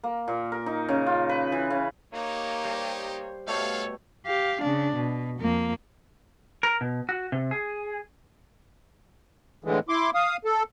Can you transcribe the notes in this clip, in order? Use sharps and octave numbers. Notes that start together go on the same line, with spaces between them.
A#3
A#2
A#4
D#4
C#3
F4
B4
E3
C#3
A#3 D#4 G4 C#5
G3 C5
B2 G3 A3 A4 B4 C#5 F5
G4 F5
C#3 D4
B2
F2 A#3
A#4
B2
F#4
C3
G#4
A2 D3 E3 G#3
E4 C6 D6
F5 D#6
A4